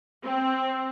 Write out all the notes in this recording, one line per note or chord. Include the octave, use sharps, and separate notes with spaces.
C4